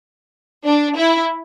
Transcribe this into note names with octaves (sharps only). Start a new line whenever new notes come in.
D4
E4